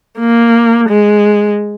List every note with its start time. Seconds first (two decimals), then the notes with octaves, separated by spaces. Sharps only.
0.19 A#3
0.89 G#3